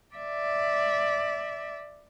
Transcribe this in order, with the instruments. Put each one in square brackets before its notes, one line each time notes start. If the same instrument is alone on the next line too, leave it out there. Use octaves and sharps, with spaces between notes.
[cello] D5 E5